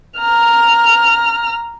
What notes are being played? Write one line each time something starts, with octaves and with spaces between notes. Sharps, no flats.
A#5 F6